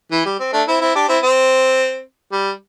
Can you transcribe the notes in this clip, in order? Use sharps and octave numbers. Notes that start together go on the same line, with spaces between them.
E3
G3
C4
A3 D4
C4 E4
C4 E4
D4 G4
C4 E4
C4
G3